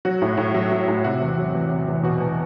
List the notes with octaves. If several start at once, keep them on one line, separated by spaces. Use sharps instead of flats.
F#3 F#4
A2
A2
F#3
F#3
A2
C3 F#4
E2
F#3
E2
C3
E2
B2 F#4
E2